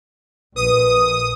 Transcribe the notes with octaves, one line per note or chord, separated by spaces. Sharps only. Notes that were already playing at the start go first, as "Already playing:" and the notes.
A#1 B4 D#6